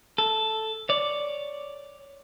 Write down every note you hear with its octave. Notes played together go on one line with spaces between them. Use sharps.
A4
C#5 D5